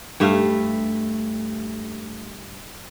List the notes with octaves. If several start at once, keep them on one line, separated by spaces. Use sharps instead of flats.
G2 A3 E5 F5